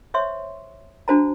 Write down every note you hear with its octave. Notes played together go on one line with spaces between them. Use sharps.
C5 C#5 E5 C6 C#6
D4 F#4 C5 A5 A#5